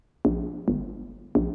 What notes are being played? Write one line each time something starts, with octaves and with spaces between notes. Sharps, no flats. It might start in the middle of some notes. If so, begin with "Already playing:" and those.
A#1
G1
A#1